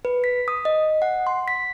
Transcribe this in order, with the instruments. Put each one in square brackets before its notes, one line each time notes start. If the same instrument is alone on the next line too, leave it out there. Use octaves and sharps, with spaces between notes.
[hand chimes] B4
B6
D#6
D#5
F#5
C6
B6